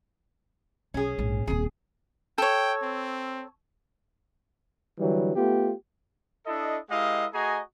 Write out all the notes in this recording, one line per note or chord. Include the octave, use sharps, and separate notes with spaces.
B1 C#4 G#4
A#1 G#2
D#1 C4 G#4
A4 C#5 G5
C4
D3 E3 F#3 G3
A3 B3 F4 G4
D4 E4 A4 D#5
G#3 E4 G4 A#4 D#5 F5
A3 F#4 G#4 D#5 G#5 A#5